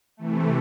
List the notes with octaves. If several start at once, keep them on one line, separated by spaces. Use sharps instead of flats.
C3 E3 A3